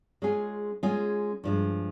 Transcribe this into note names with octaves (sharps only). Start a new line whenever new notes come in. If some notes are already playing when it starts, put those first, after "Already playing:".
G#3 C#4 F4 G#4
G#3 C#4 F4 G#4
G2 F3 G#3